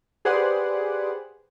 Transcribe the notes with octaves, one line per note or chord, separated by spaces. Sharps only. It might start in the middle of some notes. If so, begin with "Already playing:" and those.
G4 G#4 B4 C5 D5 F#5